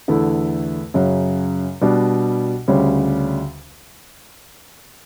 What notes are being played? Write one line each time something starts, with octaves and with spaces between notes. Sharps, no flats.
E2 D3 A3 E4
F#2 C#3 F#3
B2 G3 D4
D2 C#3 G3 C#4